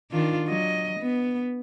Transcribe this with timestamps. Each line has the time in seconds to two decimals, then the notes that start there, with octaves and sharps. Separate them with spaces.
0.11 D#3 D4 F4
0.47 F#3 D#5
1.00 B3